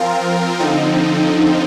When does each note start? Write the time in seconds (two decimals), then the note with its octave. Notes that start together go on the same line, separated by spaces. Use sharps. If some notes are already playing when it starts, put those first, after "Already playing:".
Already playing: F3 C4 F4 A#4
0.60 D3 F3 C4 D#4